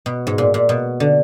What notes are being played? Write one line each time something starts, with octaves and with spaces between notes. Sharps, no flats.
B2
G#2
A#2
A#2
B2
D3